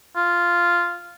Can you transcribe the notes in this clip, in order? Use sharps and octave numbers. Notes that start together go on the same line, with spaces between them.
F4